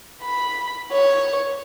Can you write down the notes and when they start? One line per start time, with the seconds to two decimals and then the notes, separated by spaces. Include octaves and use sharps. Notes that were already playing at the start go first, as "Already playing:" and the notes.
0.23 B5
0.92 C#5